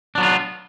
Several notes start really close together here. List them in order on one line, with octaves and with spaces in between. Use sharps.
D4 F#3 B3 F4